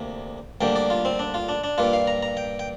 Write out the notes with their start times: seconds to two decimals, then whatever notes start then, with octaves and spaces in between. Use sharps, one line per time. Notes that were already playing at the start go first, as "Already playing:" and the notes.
Already playing: D2 C3 A#3
0.61 D2 D3 G3 A#3 G5
0.76 D5
0.90 F4
1.05 C4
1.19 D4
1.34 F4
1.49 D4
1.64 D4
1.78 G2 G3 A#3 F4
1.93 F5
2.07 A#5
2.23 A#5
2.37 G5
2.59 G5